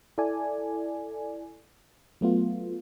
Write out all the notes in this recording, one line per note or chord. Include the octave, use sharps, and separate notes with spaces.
E4 A4 D5 G#5
F#3 A3 B3 F4